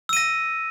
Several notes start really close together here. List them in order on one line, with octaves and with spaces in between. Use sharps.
E6 D#7 A#6